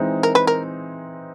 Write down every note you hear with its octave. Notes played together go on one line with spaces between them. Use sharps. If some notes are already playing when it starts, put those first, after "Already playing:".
Already playing: E3 G#3 C4 D#4
A#4
B4
A#4